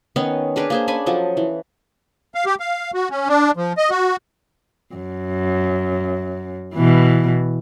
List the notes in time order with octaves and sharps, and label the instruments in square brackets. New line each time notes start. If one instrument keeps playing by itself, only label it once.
[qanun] D#3 B3 C#4 D#4
D4 G#4 A#4 B4
A#3 G#4 C5
C#4 D4 G#5 B5
F3 F#3 A4 D#5
E3
[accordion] F5
G4
F5
F#4
C#4
D4
F3
D#5
F#4
[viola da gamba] F#2
B2 E3